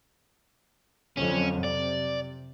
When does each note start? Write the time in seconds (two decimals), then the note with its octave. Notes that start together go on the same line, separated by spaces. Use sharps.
1.17 F2 D3 F#3 C#4
1.64 C3 D5